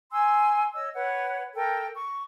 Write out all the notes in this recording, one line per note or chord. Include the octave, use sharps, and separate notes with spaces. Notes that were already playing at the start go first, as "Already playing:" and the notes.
G#5 C6 E6
C#5 D#5 E6
B4 C#5 F#5
A4 A#4 G5
C#6